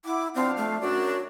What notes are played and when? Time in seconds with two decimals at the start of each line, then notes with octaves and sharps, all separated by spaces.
0.05 E4 F#5 D6
0.35 F3 C4 D4 F5
0.57 A3
0.81 F#2 D4 F#4